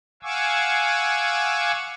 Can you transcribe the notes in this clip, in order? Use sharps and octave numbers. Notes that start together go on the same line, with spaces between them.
F5 F#5 G#5 C#6 D6 E6